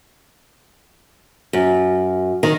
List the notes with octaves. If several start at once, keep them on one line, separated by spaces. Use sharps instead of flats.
F#2
D#3